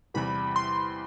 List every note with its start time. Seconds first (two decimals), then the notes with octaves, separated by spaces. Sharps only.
0.14 E2 C3 E3 G3 B5
0.56 C6